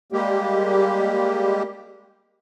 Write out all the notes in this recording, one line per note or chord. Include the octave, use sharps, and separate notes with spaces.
G3 G#3 A#3 G4